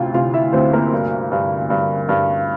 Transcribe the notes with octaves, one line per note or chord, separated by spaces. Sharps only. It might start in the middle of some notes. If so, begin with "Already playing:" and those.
Already playing: D2 C3 F4 F5
C3 F4 F5
E4 E5
D2 C4 C5
A#3 A#4
G2
G2
G2
G2